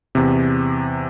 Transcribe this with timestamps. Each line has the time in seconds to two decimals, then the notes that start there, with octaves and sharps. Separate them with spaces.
0.15 E2 C3